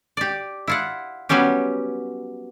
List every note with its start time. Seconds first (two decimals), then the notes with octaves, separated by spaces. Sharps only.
0.17 G4 D5
0.68 E4 F4 F#5
1.29 F#3 G3 B3 C#4 G4